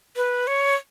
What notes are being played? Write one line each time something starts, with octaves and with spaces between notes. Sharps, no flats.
B4
C#5